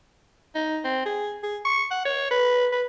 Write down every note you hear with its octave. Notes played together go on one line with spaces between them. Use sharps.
D#4
C4
G#4
G#4
C#6
F#5
C#5
B4
B4